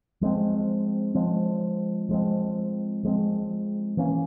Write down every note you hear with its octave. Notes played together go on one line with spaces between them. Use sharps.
F3 G#3 C4
F3 G#3 C4
F3 G#3 C4
F3 G#3 C4
E3 A#3 C#4